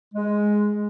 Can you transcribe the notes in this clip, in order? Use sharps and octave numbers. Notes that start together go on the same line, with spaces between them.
G#3